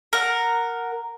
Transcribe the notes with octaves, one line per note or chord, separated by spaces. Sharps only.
A#4 F#5